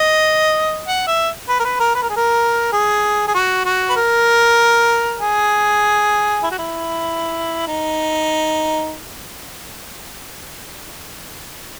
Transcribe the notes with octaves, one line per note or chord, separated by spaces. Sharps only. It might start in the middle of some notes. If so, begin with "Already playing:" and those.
Already playing: D#5
F#5
E5
B4
A#4
B4
A#4
B4
A#4
G#4
A#4
G#4
G#4
F#4
F#4
B4
A#4
G#4
E4
F#4
E4
D#4